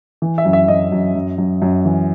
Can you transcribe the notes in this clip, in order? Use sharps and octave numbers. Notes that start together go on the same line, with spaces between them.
E3
E5
F#2
E5
F#2 D#5
F#2
F#2
F#2
F#2
E3